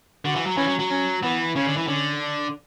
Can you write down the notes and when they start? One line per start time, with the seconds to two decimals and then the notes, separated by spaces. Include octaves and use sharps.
0.25 D3 F#4
0.35 E3
0.46 F#3
0.57 E3 C#4
0.68 F#3
0.79 F#3
0.90 C#4
1.22 E3 B3
1.56 C#3 C#4
1.66 D3
1.77 E3
1.87 D3 C#4
2.20 D4